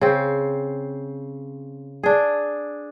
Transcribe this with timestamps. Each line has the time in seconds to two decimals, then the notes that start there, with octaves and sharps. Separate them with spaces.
0.01 C#3 C4
2.03 D4 G#4